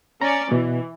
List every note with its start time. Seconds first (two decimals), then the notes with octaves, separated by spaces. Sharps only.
0.22 C#4 D5 A#5
0.52 B2 E3